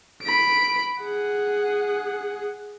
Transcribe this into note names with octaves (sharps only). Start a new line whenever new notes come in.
B5 D7
G#4 F#5